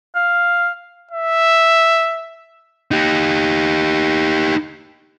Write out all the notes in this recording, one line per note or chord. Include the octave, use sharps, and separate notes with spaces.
F5
E5
D#4 G4